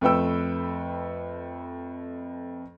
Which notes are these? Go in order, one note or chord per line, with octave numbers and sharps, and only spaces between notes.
F2 A3 B4 G5 E6